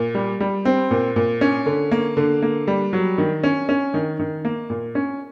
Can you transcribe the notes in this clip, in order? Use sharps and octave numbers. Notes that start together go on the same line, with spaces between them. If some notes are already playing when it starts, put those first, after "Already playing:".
Already playing: A#2
G3
G3
C4
A#2
A#2
C#4
D3
A#3
D3
A#3
G3
F#3
D#3
C#4
C#4
D#3
D#3
A#3
A#2
C#4